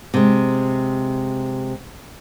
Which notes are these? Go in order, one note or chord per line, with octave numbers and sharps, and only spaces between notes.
C3 G#3